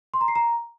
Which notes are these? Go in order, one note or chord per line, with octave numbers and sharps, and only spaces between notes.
C6
A#5
C7
A#5